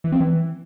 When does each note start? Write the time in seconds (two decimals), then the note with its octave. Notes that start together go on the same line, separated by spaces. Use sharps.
0.04 E3
0.12 C4
0.20 E3